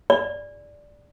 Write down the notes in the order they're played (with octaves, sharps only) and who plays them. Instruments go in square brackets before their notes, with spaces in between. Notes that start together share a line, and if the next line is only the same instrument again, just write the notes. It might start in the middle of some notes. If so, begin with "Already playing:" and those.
[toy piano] D5